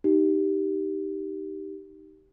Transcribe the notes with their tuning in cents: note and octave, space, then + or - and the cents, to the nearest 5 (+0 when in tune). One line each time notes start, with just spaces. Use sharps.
D#4 +0 G4 -10